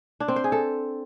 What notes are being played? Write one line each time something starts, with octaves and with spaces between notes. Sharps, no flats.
D4
C4
C5
G#4
A4